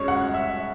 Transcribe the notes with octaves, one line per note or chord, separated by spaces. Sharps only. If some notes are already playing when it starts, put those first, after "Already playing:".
Already playing: C#2 C#3 C#5
F#5
E5